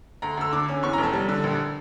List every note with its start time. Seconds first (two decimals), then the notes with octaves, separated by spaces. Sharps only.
0.22 D2 A#5
0.37 D2 E6
0.53 D3 D6
0.68 C#4
0.83 E2 C#6
0.93 A#5
0.98 F1
1.03 A5
1.13 G3
1.29 D3
1.44 A#1